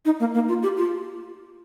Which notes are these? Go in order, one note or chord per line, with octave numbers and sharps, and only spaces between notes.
D#4
A#3
A#3
F4
G4
F4